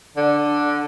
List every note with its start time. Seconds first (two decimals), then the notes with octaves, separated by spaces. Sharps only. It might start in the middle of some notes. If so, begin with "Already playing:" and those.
0.17 D3